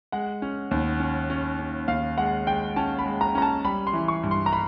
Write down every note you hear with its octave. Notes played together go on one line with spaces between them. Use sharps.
G#3 F#5
C#4
D#2
C#4
C#4
C#4
D#2 F5
G#3 F#5
G#3 G5
C#4 A5
B5
G#3
A#5
C#4 A#5
A5
G3 B5
C6
E3
C#6
G2
C6
A#5
B5